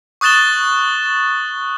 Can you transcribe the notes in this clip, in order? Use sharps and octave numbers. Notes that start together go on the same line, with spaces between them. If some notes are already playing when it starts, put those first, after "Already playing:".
C#6 D#6 F#6 A6 E7 G7